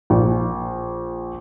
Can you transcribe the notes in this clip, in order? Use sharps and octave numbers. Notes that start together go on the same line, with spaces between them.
A#1